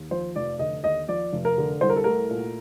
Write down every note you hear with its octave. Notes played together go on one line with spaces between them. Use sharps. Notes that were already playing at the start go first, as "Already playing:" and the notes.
Already playing: D#2
F3 C5
F1 D5
D3 D#5
D#2 D#5
F3 D5
F1
A#4
D3
C2 C5
A#4
A4
A3 A#4
A#2